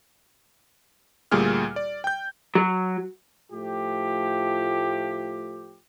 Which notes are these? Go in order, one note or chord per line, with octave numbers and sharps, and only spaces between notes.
D2 A#2 G3 G#4 F6
D5
G5 G6
F#3
A2 F3 A3 F4 G4